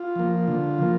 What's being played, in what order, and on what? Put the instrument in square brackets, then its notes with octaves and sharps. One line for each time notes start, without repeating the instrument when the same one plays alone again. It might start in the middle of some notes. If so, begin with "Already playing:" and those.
Already playing: [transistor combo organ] F4
F3 A#3
D3 F4
F3 A#3